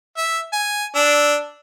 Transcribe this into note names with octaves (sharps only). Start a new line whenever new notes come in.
E5
G#5
D4 E6